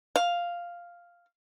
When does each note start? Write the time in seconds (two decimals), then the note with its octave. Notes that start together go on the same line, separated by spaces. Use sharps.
0.16 F5